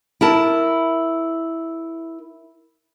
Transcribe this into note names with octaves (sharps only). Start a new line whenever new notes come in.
E4 A#4 A5